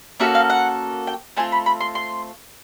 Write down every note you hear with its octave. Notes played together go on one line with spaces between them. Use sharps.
A#3 C#4 F#4 A4 E5
F5
F#5
G5
A3 C4 F4 G#5
B5
B5
C6
C6